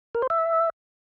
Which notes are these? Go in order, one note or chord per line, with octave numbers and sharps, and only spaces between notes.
A#4
C5
E5